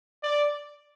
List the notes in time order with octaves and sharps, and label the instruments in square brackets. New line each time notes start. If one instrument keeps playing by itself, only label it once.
[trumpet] D5